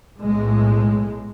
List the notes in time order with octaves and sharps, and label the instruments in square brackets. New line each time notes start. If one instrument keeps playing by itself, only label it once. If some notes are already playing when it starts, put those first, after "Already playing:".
[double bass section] B1 A2 G#3